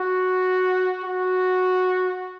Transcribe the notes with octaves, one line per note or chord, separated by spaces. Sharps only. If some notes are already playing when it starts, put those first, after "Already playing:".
Already playing: F#4
F#4